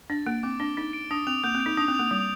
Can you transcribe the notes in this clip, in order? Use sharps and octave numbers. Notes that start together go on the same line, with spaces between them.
D4 A6
A#3 D7
C4 D6
D4 G7
D#4 A6
D7
D4 D#6
C4 F7
A#3 G6
C4
D7
D#4
D4 D#6
C4
A#3 F7
G3 G6